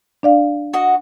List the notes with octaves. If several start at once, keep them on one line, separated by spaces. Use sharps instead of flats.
D4 D5 F5
F#4 D#5 F#5